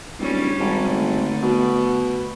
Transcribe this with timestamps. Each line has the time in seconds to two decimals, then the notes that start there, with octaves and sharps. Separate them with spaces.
0.20 D1 G3 C#4
0.60 G#1
0.89 D3 A3
1.43 B2